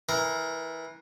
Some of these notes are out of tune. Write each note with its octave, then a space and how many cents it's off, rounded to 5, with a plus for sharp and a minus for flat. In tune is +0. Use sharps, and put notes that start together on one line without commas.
E3 -20 A#4 +0